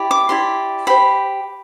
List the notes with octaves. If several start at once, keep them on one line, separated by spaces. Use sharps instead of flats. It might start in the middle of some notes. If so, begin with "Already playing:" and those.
Already playing: E4 G4 D5
D6
E4 G4 D5 C6
G4 C5 B5